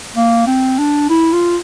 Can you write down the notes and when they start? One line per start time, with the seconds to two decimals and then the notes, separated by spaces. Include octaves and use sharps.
0.16 A#3
0.47 C4
0.78 D4
1.10 E4
1.33 F4